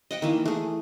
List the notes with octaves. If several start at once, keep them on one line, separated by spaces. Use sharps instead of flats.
D#5 F#5 G5
D#3 E3 A#3
A3 G#4